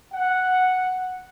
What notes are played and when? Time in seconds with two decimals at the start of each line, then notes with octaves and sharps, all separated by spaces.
0.12 F#5